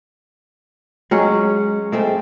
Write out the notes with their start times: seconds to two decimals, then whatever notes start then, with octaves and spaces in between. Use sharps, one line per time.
1.11 F#3 G#3 C#4
1.92 G#3 A3 C4